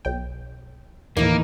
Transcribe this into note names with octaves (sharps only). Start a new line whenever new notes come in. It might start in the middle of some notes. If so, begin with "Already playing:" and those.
B1 G5
D#2 A2 E3 A#3 D#4